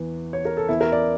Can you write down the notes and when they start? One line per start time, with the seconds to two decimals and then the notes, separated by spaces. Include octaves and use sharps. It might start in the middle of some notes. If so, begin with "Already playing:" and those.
Already playing: E2 E3
0.33 C#5
0.45 A#4
0.57 A4
0.69 E2 E3 E4
0.81 A#4
0.92 D5